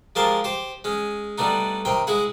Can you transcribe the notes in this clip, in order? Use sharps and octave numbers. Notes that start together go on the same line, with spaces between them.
F3 G#3 G4 A#4 A5 C6
G4 C5
G#3 C#4
G3 A3 B3 D4 D#4
C3 D#3 C4 G5
G#3 E4 G#4 F#5